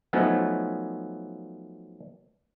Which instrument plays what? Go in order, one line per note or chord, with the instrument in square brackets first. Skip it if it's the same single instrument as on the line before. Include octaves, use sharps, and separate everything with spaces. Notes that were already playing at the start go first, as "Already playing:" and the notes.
[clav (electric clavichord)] F3 F#3 A3 B3 C#4 D#4